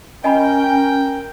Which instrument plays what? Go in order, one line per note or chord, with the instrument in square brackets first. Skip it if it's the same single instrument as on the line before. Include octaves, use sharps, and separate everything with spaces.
[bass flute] C#4 [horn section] A#4 G5 [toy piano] D#5 G#5 B5